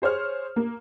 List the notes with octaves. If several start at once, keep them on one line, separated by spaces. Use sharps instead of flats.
G#4 C5 C#5 F6
A#3